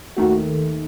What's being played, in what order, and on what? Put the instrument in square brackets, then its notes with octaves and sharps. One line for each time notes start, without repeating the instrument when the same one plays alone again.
[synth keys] D#2 D#3 A3 [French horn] F#4